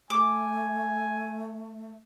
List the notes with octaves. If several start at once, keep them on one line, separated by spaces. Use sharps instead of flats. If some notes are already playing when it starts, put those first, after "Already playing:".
A3 G#5 D6